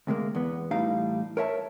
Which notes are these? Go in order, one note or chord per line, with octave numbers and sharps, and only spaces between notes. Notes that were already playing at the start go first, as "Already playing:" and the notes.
D2 C3 G#3 A#3
E2 B3
A2 E3 G3 D#4 F5
A#4 C#5 E5 A5